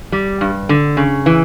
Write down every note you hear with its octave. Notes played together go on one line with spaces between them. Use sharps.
G3
G2
D3
C#3
E3